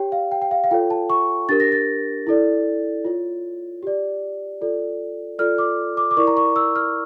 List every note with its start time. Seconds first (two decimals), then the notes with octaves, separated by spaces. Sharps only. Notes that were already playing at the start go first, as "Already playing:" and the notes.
Already playing: G4 C#5 G5
0.12 F5
0.32 G5
0.42 G5
0.51 F5
0.64 F5
0.71 F4 A4 C#5 G5
0.90 A5
1.10 C#6
1.49 D4 G4 A#4 A6
1.60 A#6
1.72 A6
2.27 E4 A4 D5
3.05 F4 C#5
3.83 G4 D5
4.61 F4 A4 D5
5.39 F4 A4 D5 F6
5.58 D6
5.97 D6
6.11 D6
6.17 E4 A#4 D5 C#6
6.27 A#5
6.37 C#6
6.56 E6
6.76 F6